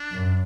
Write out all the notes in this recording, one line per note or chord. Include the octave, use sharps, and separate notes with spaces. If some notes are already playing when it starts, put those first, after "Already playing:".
Already playing: D4
F#2